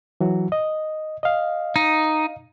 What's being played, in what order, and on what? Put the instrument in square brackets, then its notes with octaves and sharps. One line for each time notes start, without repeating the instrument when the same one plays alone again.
[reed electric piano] E3 F#3 F#4
D#5
D#5 F5
[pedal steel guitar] D#4